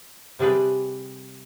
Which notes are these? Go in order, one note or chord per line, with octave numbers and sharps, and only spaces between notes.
C3 G3 D4 G#4 B4